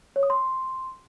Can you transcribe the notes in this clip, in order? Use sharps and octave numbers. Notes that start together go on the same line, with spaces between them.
C#5
D#6
C6